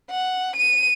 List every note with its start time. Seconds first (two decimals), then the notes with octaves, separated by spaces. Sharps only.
0.11 F#5
0.56 D#7